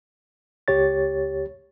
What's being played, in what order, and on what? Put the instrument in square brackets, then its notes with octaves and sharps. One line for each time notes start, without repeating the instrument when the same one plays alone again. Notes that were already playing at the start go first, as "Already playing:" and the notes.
[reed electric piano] C#2 G4 C#5 A6